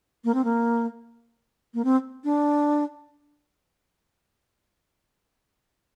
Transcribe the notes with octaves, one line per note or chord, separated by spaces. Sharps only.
A#3
C4
A#3
A#3
C4
D4